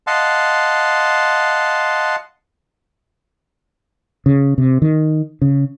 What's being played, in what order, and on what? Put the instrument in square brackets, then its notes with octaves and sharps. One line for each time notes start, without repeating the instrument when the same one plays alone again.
[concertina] D#5 F5 F#5 A5 C6
[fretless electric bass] C#3
C3
D#3
C#3